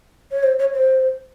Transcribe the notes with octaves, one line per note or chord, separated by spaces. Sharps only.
C#5
C5
C#5
C5